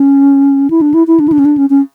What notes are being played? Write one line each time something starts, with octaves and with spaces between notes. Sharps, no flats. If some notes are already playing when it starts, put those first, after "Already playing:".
Already playing: C#4
E4
D4
E4
E4
D4
E4
D4
C#4
D4
C#4
C#4